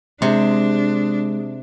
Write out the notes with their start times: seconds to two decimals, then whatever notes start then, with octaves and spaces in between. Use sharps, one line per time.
0.22 C3 G#3 D4